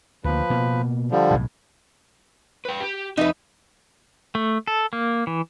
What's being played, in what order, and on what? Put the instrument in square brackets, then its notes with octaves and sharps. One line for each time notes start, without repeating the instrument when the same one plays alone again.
[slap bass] D2 A#3 [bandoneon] F3 B4
[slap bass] B2 A#3
[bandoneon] D3 F3 G3
[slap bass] B1 A2
[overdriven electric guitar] B4 G5
G4
[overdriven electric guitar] F2 E5 [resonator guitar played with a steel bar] D#4 B4
[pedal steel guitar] A3
A4
A#3
E3